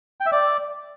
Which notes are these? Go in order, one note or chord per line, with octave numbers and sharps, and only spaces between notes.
G5
E5
D5